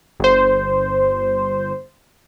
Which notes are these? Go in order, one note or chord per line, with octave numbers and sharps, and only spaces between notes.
G1 C5